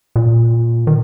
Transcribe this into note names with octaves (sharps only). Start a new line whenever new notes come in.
A#2
D#3